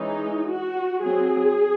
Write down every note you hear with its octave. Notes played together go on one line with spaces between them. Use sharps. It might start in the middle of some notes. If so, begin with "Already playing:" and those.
Already playing: E3 G#3 C#4 D#4
F#4
F#3 C4 G#4